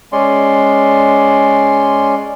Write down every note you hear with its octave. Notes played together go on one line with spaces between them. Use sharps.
G#3 C#4 D5 C6